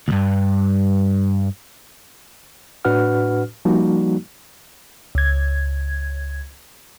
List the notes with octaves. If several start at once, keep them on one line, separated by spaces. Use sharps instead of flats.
D2 G2
A2 D4 F#4 B4 F#5 F6
F3 G3 A#3 D#4 F#4
C#2 G#6